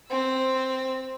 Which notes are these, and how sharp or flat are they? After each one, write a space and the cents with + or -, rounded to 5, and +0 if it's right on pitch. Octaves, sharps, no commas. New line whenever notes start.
C4 +0 E6 +0